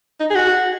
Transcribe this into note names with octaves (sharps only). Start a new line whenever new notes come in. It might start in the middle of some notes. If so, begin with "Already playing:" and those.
D#4
G#4
F#4